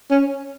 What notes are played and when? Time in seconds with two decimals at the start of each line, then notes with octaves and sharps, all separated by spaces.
0.11 C#4